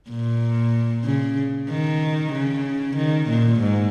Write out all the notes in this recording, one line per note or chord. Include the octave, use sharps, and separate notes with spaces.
A#2
C#3
D#3
C#3
D#3
A#2
G#2